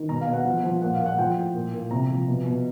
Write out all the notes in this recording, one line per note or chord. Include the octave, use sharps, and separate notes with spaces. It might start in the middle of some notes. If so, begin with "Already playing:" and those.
Already playing: D#3
B2 A#5
F5
B2
F#5
F3
F3
A#2 F#5
F5
A#2
F#5
F3 G5
A2
A#2
A#2
C3 A#5
F3
B2
B2